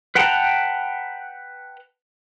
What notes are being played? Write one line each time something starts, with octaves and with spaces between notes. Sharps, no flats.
B4 F#5 G5 A5 A#5